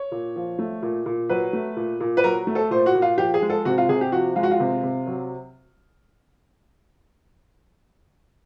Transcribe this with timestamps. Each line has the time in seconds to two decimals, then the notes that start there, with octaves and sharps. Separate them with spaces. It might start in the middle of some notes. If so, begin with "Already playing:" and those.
Already playing: C#5
0.12 A#2
0.36 F3
0.59 A3
0.82 A#2
1.06 A#2
1.29 F#3 B4
1.53 A3
1.76 A#2
2.00 A#2
2.17 B4
2.24 F#3 A#4
2.47 A3
2.55 A4
2.71 A#2 C5
2.86 F#4
2.95 A#2
3.02 F4
3.18 F3 G4
3.34 G#4
3.42 G#3
3.50 A4
3.65 C3 F#4
3.78 F4
3.89 C3 G#4
4.01 G4
4.12 F3 F#4
4.36 G#3 F4
4.43 F#4
4.51 F4
4.60 C3
4.83 C3
5.07 F#3